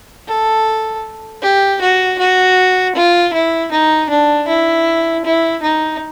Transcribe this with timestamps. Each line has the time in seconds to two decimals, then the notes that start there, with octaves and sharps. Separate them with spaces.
0.28 A4
1.42 G4
1.81 F#4
2.19 F#4
2.95 F4
3.33 E4
3.72 D#4
4.10 D4
4.48 E4
5.25 E4
5.63 D#4